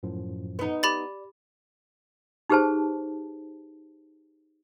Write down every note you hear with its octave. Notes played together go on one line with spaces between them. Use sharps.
F#2 A2 F3
B3 D#4
G4 D5 B5 A6
D#4 G4 G#4 B4 C5 A5